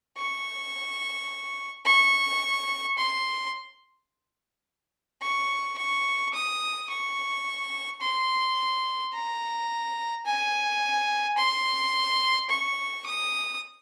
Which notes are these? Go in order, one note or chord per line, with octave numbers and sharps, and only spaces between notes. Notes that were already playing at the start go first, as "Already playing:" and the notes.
C#6
C#6
C6
C#6
C#6
D#6
C#6
C6
A#5
G#5
C6
C#6
D#6